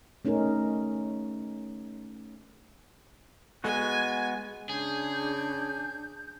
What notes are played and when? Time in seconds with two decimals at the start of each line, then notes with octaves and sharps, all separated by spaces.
0.25 A3 C#4 D#4 G#4 A#4
3.64 G#3 B3 F#4 G#5
4.69 C#3 D4 G#4 G6